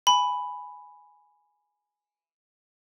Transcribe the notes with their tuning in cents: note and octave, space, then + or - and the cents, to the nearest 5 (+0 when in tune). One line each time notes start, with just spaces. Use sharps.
G#5 +0 B5 +0